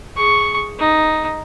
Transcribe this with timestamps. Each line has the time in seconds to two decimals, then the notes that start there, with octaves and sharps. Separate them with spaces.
0.16 G#4 C#6
0.79 D#4